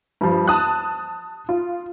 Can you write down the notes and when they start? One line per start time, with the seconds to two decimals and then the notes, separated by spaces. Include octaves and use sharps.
0.21 G2 F3
0.48 A5 D#6 F#6
1.49 F4